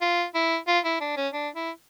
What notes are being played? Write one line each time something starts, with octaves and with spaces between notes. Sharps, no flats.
F4
E4
F4
E4
D4
C#4
D4
E4